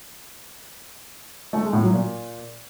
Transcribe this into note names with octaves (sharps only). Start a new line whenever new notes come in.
A3
G#3
A2
F#3
A#2